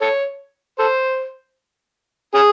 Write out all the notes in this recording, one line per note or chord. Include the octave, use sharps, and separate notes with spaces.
A4 C#5
A4 C5
C#4 G#4